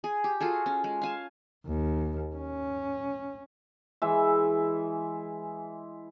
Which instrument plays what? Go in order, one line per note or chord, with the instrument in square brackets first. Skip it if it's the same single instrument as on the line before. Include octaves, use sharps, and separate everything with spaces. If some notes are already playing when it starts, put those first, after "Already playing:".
[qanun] G#4
G4
F4 F#4 G#4 A4
C#4
G#3
F5 G#5 A5
[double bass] D#2
C#4
[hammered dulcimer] E3 G#3 E5